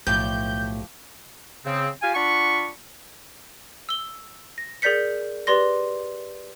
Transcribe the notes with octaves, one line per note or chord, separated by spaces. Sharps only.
B1 A2 F3 G4 A5 G6
C#3 C4
F4 G4 F5 G#5
D4 F4 F#5 B5 C#6
E6 G7
A#6
G#4 A#4 D5 G6 B6 C#7
G4 B4 D5 C6 A#6